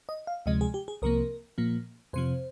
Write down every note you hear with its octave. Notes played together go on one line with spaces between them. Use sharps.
D#5
F5
D2 C3 F3 G#3 D#5
G#4
G4
G#4
C2 C3 F3 A#3 A#4
A#2 F3 A#3
F2 C3 F3 C5